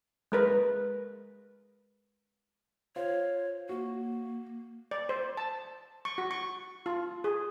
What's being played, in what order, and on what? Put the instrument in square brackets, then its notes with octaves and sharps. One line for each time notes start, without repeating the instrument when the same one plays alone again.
[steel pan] G#3 A#4 B4
[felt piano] F4 C5 [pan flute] C#5
[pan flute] A#3 [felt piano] F#4
[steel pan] D5
C5
A5
C#6
F#4
C#6
F4
G#4